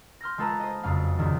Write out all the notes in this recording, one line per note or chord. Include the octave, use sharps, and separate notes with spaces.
C6 F6 G6 A#6
G#3 F4 A4 B4 A5 A#5
C5 D#5
F#1 F2 G#3 F5
C#2 G#2 D#3 F3 G3